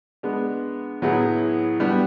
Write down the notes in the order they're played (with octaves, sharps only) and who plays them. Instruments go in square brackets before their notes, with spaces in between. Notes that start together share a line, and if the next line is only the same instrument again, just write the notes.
[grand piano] G#3 B3 D4
A2 F#3 B3 E4 G#4
G3 B3 D4 G4